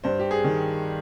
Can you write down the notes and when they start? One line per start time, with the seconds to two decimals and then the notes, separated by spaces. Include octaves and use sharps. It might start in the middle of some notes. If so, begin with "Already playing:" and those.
0.04 G2 C5
0.19 G4
0.31 G#4
0.44 D#3